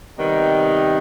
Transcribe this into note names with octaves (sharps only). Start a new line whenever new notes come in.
C3 D#3 G3 B3 D#4